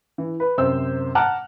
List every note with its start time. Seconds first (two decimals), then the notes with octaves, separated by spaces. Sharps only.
0.18 E3
0.40 B4
0.58 F#2 C3 C5 E6
1.15 F#5 A5 A#5 D6 F6 F#6